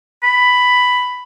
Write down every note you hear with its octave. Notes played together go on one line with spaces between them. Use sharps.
B5